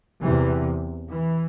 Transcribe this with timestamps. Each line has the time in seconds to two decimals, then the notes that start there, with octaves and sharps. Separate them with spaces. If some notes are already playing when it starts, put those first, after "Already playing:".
0.23 E2 C3 E3
1.11 E3